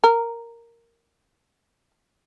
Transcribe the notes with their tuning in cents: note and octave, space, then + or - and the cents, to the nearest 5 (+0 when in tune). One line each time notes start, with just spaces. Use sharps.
A#4 -5